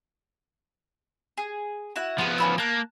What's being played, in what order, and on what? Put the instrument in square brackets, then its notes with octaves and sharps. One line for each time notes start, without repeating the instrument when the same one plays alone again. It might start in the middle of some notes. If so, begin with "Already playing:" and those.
[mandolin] G#4
E4 F#4 F#5
[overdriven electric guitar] F3 B3 [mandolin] F4 G#4
[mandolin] C#4 B5 E6
[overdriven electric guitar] A#3 [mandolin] A5 F#6